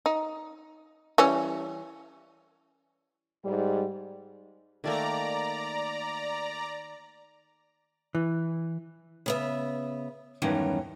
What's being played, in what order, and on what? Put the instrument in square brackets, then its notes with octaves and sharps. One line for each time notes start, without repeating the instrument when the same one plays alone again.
[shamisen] D#4
E3 G3 C#4
[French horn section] G#2 G3
[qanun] D#3 A3 A#3 [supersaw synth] D5 A#5
[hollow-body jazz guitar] E3
[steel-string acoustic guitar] C#3 B3 E5
E2 G2 D#3 F#3 C#4